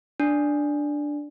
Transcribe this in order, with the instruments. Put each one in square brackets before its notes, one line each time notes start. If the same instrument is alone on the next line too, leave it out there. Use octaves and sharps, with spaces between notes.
[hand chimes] D4